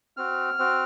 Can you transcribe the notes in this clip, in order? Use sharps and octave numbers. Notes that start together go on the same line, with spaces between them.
C4 F#4 F6
C4 F#4